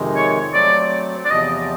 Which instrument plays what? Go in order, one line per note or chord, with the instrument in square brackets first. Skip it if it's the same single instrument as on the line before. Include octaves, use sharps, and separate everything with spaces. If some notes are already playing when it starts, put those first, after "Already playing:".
Already playing: [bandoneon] F2 C3 D#3 G#3
[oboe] C#5
[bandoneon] F#3 A3 C4 [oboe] D5
[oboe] D5
[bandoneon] E2 C3 F3 [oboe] D#5